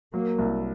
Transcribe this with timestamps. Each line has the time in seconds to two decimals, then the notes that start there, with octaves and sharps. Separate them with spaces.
0.14 F#3 A#3
0.39 C2